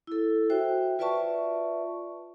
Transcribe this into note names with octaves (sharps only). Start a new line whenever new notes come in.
E4 A4
F#4 C5 E5 G5
F4 B4 D5 E5 A5 C#6